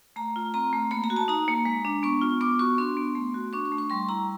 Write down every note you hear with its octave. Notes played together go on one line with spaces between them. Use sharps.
A3 A#5
F4
C4 A#5
A3
A#3 B5
A#5
F#4
A5
D#4 A#5
A#3
G#3
D4
B3 C#6
F4
B3 D6
F#4 C#6
D4 C6
B3
A3
F#4
D4 C#6
C#6
A3
C#6
G3 C6
E4 A#5